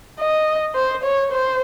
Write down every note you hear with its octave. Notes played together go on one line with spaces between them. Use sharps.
D#5
C5
C#5
C5